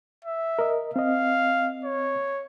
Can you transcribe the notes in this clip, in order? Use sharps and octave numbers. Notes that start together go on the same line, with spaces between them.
E5
A#4 D#5
C4 D#5 F5
C#5